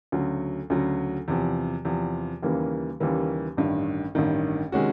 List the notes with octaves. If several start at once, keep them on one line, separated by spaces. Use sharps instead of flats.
D2 C#3 F#3
D2 C#3 F#3
E2 C3 F3
E2 C3 F3
D#2 C#3 E3 G3 A#3
D#2 C#3 E3 G3 A#3
A1 G2 D#3
A1 G2 D#3
C3 D#3 G#3 C#4 F#4